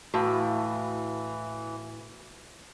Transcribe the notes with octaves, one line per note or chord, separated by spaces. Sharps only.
A2 E3 F#4 F5